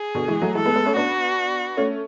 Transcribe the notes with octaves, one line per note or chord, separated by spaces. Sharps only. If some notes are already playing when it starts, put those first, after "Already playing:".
Already playing: G#4
B2 D3
E3 G#3
F#3 A3
E3 G#3 A4
G#3 B3
G#3 B3
A3 C#4
B3 D4 F#4
A3 C#4